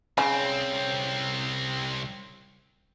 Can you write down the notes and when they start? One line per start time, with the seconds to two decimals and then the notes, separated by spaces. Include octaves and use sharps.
0.18 C2 C#3 C4